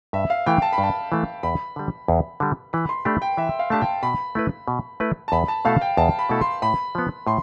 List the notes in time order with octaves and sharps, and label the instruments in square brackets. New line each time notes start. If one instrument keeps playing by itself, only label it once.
[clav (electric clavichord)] G2 [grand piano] E5
[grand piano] F5
[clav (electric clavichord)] E3 A3 [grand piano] G5
[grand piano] A5
B5
[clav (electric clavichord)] G2
[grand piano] A5
[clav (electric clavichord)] E3 A3
[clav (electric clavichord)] E2 [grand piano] B5
[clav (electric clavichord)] D3 G3
E2
D3 G3
[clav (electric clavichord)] E3 [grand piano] B5
[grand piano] C6
[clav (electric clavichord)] A3 D4 G4 [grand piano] B5
[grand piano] G5
[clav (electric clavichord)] E3 [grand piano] E5
[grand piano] F5
[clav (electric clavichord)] A3 D4 G4 [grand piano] A5
[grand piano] G5
[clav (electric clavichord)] B2 [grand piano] B5
[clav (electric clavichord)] A3 E4 B4
B2
A3 E4 B4
[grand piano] A5
[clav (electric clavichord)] E2 [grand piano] B5
[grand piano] A5
[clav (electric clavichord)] B2 A3 E4 A4 [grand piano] F5
[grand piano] G5
[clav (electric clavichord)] E2 [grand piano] A5
[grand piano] B5
[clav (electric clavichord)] B2 A3 E4 A4
[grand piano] C6
[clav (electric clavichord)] A2 [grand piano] B5
[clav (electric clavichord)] F3 B3
[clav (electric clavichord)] A2 [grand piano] C6